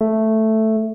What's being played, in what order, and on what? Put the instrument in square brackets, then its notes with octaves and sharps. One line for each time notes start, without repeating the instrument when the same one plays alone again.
[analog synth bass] A3